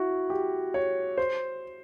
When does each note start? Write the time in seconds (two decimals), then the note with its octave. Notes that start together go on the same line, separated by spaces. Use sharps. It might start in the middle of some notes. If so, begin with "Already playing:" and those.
Already playing: E4 F#4
0.30 G4
0.74 C#5
1.18 C5